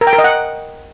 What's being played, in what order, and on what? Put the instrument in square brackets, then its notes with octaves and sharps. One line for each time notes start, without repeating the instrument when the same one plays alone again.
[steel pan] A#4
G5
A#4
D#5
F#5